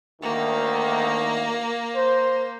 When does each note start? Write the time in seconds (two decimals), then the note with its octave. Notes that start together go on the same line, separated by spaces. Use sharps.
0.22 D2 D#3 A#3
1.95 C5